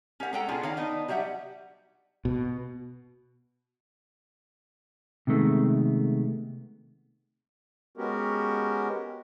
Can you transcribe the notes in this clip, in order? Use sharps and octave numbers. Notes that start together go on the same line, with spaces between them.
C#4 G4 A#4 F5 F#5
G#3 C#4 A4 F#5 G5 A#5
B2 C#4 D4 F4 G#4 F#5
D#3 D4 C#5 F5
B3 D4 D#4
F#3 G3 G4 E5 F#5
B2
C3 D#3 G#3 A3 B3
G#3 B3 C#4 F#4 G4 A#4